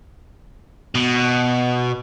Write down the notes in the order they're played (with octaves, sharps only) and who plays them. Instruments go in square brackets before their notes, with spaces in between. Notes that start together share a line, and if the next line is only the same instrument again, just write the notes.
[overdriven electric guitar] B2